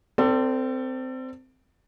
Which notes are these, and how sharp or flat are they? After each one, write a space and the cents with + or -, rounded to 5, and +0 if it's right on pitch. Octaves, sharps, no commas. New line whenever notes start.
C4 -15 A4 +30 D5 -30